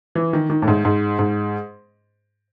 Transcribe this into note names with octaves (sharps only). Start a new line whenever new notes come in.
E3
D#3
D#3
A2
G#2
G#2
G#2